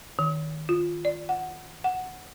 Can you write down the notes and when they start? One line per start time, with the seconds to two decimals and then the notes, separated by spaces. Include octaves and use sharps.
0.19 D#3
0.69 F4
1.05 D5
1.29 F#5
1.84 F#5